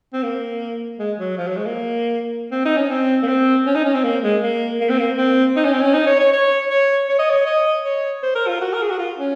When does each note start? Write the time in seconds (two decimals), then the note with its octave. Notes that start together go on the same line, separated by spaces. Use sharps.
0.13 C4
0.23 A#3
0.99 G#3
1.19 F#3
1.37 F3
1.47 F#3
1.56 G#3
1.66 A#3
2.51 C4
2.65 D#4
2.77 C#4
2.90 C4
3.23 A#3
3.28 C4
3.66 C#4
3.75 D#4
3.84 C#4
3.94 C4
4.04 A#3
4.23 G#3
4.42 A#3
4.80 A#3
4.90 C4
4.98 A#3
5.18 C4
5.56 D#4
5.65 C#4
5.73 C4
5.82 C#4
5.94 D#4
6.06 C#5
6.19 C#5
6.33 C#5
6.70 C#5
7.08 C#5
7.19 D#5
7.30 C#5
7.46 D#5
7.85 C#5
8.23 C5
8.35 A#4
8.48 F4
8.61 F#4
8.73 A#4
8.82 G#4
8.90 F#4
8.98 F4
9.18 C#4